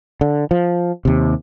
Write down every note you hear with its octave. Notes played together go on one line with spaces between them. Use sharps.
D3
F3
D#2 C3